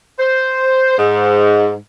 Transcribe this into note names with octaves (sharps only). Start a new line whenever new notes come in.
C5
G#2